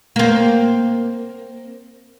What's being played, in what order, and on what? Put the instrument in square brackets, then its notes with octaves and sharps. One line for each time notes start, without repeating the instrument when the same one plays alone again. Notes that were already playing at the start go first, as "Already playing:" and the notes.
[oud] A#3 C4